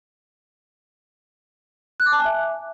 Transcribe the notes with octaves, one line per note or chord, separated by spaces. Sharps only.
F#6
D6
A5
G#5
E5